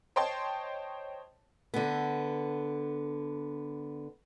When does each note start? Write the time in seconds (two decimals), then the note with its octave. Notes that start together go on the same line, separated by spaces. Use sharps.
0.16 C5 C#5 D#5 G5 A5 C6
1.74 D3 B3